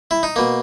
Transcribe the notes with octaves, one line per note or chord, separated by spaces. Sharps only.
E4
D#4
B2 A#3